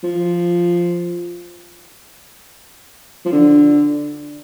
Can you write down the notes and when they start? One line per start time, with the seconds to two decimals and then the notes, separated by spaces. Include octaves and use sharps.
0.04 F3
3.25 F3
3.33 D3